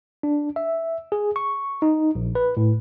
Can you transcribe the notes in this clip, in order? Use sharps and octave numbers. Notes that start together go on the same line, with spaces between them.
D4
E5
G#4
C#6
D#4
A#1
B4
A2